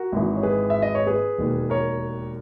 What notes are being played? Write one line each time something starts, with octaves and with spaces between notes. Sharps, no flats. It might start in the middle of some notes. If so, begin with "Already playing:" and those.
Already playing: F#4 A#4
G#1 G#2 E3
C#5
G#4 B4
E5
D#5
C#5
G#4 B4
E1 D#2 D#3
A#4 C#5